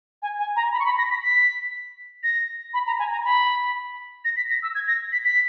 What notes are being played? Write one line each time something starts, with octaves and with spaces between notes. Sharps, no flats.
G#5
G#5
A#5
B5
C#6
B5
A#6
B6
B6
A#6
B5
A#5
G#5
A#5
B5
A#6
B6
A#6
E6
G#6
A#6
B6
B6